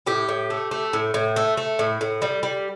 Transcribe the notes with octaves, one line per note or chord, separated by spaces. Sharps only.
A2 G4
A2
A3
A3
A2
A2
A3
A3
A2
A2
G3
G3